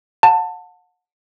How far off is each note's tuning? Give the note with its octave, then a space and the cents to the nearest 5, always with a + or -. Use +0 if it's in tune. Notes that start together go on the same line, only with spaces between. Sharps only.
F#5 -35 A5 +20